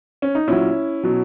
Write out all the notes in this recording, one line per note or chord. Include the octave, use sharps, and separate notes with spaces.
C#4
D#4
A#2 F#3 C#4 E4
B2 F#3